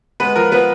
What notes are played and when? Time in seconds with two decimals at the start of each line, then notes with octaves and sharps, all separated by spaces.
0.20 G#3 B3 B4
0.36 F3 A#4
0.52 F3 B3 B4